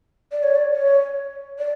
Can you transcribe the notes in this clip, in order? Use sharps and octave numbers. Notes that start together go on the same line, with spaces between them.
D5
C#5
D5
C#5
D5